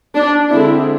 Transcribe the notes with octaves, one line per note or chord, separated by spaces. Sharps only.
D4
D3 G#3 C4 E4